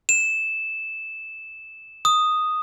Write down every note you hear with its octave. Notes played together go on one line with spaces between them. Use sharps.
E7
D#6